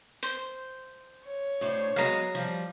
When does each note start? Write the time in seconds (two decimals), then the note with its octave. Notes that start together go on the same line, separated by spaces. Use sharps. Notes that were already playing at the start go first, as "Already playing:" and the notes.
0.23 C5
1.26 C#5
1.61 A2 D4 C5
1.96 F#3 G#3 B3 F5 A#5
2.35 F3 G3